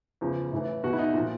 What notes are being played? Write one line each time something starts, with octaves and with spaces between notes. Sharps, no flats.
E2 C#3 F3
A2 E3
E2 B2 F#4
E4
D#4
A#2 F3